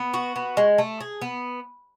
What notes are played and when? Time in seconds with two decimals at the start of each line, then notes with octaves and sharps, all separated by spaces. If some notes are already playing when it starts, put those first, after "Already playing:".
Already playing: B3
0.14 F#4
0.36 B3
0.57 G#3
0.78 A3
1.00 G#4
1.22 B3